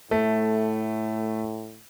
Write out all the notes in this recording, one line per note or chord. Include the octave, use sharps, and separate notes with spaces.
A2 A3